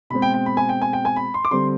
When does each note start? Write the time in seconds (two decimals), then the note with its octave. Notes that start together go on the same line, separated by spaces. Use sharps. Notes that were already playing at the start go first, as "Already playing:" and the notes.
0.10 B2 G#3 C4 B5
0.22 G5
0.34 G5
0.46 B5
0.57 G#5
0.69 G5
0.82 G#5
0.93 G5
1.05 G#5
1.16 B5
1.34 C6
1.45 D6
1.51 D3 G3 C4 C6